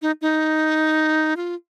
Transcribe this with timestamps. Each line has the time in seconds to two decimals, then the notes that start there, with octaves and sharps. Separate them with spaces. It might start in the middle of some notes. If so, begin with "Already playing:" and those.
0.02 D#4
0.22 D#4
1.37 F4